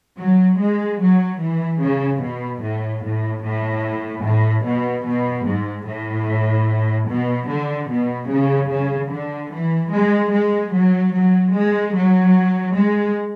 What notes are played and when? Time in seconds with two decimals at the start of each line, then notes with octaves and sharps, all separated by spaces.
0.17 F#3
0.58 G#3
0.99 F#3
1.39 E3
1.79 C#3
2.20 B2
2.61 A2
3.01 A2
3.42 A2
4.23 A2
4.64 B2
5.04 B2
5.44 G#2
5.85 A2
7.06 B2
7.47 D3
7.88 B2
8.28 C#3
8.69 C#3
9.09 D3
9.49 E3
9.90 G#3
10.30 G#3
10.71 F#3
11.12 F#3
11.52 G#3
11.93 F#3
12.73 G#3